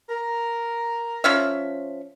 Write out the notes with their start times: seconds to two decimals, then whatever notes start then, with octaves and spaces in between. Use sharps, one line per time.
0.09 A#4
1.24 F3 C#4 E5